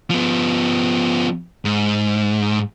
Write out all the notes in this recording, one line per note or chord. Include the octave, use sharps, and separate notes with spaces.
F3 B3
G#2